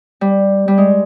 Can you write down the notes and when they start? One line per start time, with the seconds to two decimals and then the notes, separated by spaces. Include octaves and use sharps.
0.21 G3
0.68 G3
0.78 G#3